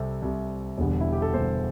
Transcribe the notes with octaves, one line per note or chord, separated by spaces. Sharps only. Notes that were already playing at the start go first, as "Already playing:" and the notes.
Already playing: C2 C3 G3 A4
C2 C3 G3
E1 E2 D3 G3
E4
G4
A4
E1 E2 D3 G3 C5